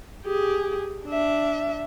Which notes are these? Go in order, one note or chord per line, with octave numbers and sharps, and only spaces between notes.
G4 G#4
D4 E5